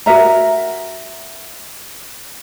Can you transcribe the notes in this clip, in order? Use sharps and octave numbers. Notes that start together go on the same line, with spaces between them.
F#4 A#4 E5 A#5